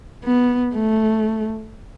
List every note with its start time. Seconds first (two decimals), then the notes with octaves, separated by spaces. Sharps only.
0.24 B3
0.74 A3